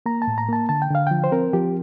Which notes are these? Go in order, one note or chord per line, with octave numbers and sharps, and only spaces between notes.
A#3 A#5
A5
A2
A#5
A#3 A5
D3 A5
G5
D3 F5
F3 G5
C5
C4 A#4
F3 G4